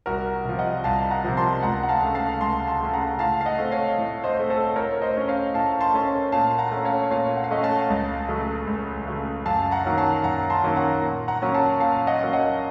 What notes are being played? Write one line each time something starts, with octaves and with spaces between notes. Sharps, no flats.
C2 F#4 A#4
C3 F3
D#5 F#5
C2 F5 A5
F#5 A#5
C3 F3
A5 C6
C#2 F#5 A#5
F#5
F5 A5
C#3 A3
F5 A5
C#2 A5 C6
A5 C6
C#3 A3
F#5 A#5
A2 F5 A5
F5
D#5 F#5
A3 C4
C#5 F5
A2
C5 D#5
A3 C4
A4 C5
A2 A#4 C#5
C5 D#5
A3 C#4
C#5 F5
A2 F5 A5
A5 C6
A3 C#4
A#2 F5 A5
F#5 A#5
A3 C#4
C#5 F5
A#2 C#5 F5
F#5
F5
A3 C#4 D#5 F#5
F5 A5
C#2
C#3 F#3 A3
C#2
C#3 F#3 A3
F#2 F5 A5
F#5 A#5
D#3 F#3 A#3 C#4
F5 A5
F#2 F#5 A#5
A5 C6
D#3 F#3 A#3 C#4
F#5 A#5
A#2
F#5 A#5
F#3 A#3 C#4
F5 A5
A#2 F5 A5
D#5 F#5
F#3 A#3 C#4
D#5 F#5